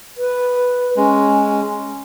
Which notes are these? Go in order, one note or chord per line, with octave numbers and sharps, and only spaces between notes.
B4
G#3 C#4